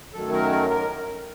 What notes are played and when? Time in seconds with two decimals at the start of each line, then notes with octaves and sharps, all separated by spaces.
0.14 F#2 D#3 F#3 A3 A4
0.32 A#4
0.51 A#4
0.69 A#4